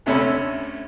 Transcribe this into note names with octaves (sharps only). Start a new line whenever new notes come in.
D2 C3 A3 C#4 C#5 B5